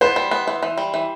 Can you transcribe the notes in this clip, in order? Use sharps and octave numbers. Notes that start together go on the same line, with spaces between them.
B3 C5
G3
B3
E3
E3
G3
E3